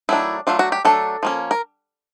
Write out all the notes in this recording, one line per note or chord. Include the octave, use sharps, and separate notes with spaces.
D#3 F#3 A3 D4 E4
F#3 A3 D4 F4
F#4
G4
F#3 A3 D4 A4
F3 A#3 C#4
A#4